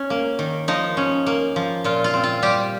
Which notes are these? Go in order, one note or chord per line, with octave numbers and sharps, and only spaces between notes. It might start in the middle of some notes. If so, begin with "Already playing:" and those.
Already playing: C#4
A#3
D#3
F3 D#4
C#4
A#3
F3
A#2 F4
F4
C4
F4
G3 G4